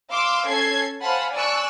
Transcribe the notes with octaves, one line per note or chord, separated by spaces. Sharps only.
F5 C6 D6 E6
C#4 A4 G#6 C7
C5 F5 F#5 G#5 A5 B5
D5 G#5 A5 C#6 E6 F#6